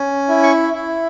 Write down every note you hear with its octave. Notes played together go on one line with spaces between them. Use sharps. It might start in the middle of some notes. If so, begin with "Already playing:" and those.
Already playing: C#4
E4
C#6
E4